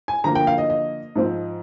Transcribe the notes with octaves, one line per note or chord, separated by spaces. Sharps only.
G#5
D3 F3 A#3 A#5
G5
F5
D#5
D#5
G#2 F3 C4